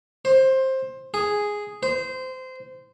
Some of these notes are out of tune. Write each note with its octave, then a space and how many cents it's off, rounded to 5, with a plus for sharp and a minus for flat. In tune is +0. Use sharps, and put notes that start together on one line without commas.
C5 +15
G#4 +0
C5 -20